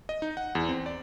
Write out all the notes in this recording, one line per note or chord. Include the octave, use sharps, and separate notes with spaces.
D#5
D#4
F#5
E2
C4
D5